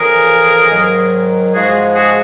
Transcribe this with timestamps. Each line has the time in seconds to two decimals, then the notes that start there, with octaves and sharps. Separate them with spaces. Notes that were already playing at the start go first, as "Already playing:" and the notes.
Already playing: F2 C#3 E3 G#4 A#4
0.69 G#2 D#3 F#3
1.53 G#2 F3 G#3 F#4 G#4
1.95 F#4 G#4